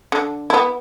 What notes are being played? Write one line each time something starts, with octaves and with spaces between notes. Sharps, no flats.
D3
B3 E4